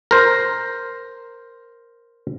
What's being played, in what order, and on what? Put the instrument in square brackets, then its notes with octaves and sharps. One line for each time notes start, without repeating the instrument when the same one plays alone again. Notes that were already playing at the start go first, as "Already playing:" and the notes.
[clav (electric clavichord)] A#4 C5